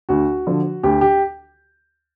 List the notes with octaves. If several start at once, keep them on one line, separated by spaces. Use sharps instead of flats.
D2 F#4
D3 F3
D2 G4
G4